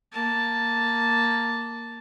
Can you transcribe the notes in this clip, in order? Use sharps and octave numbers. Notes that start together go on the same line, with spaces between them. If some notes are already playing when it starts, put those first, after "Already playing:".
A#3 A5